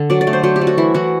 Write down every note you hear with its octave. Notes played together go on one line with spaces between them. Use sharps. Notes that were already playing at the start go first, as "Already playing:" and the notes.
Already playing: D3 A4
F#3 D5
D5
A3
C5
F#3 A4
G4
F#3
F#4
E3 E4
E3 F#4